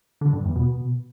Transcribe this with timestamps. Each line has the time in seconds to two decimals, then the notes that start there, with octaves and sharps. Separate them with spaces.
0.21 D3
0.33 G2
0.44 E2
0.56 B2